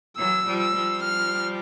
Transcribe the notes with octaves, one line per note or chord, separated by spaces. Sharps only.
E3 F#3 E6
F3 G3
E6
F3 G3
F6